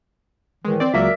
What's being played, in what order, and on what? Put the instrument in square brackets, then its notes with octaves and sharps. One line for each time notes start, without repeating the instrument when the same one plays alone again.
[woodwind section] A2 D#3 E3 [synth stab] G#3
[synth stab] C4 D5
[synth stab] C#2 F#3 A#3 [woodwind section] A#4 D5 E5